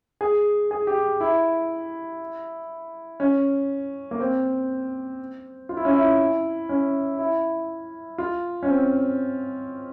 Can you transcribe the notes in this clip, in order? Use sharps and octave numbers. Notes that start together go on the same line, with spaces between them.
G#4
G#4
G4
E4
C#4
A#3
C4
F4
E4
C#4
E4
C#4
E4
F4
C#4
C4